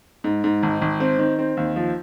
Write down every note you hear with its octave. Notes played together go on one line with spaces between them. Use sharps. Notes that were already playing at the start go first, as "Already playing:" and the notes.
G#2
G#2
G#1
G#1
C4
D#3
C4
D#2
F3